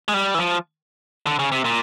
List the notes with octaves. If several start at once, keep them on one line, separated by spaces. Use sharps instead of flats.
G#3
G3
E3
F3
D3
C#3
C3
A#2